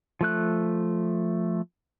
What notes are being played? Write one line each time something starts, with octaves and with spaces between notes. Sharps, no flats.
F3 A3 F#6